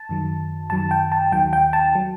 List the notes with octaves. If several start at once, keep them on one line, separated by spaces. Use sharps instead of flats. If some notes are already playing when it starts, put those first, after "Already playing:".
Already playing: A5
F#2 D#3 F#3
F#2 D#3 F#3 A5
G5
A5
D#2 D#3 F#3 G5
G5
A5
F#3